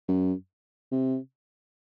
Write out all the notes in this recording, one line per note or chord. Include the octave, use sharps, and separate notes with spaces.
F#2
C3